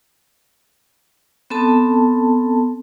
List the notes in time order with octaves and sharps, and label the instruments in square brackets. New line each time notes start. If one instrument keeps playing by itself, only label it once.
[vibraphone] B3 C4 A4 A5